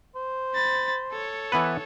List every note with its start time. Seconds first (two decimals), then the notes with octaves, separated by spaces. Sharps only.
0.15 C5
0.54 B5 A6
1.12 A4 C#5
1.52 E3 B3 B4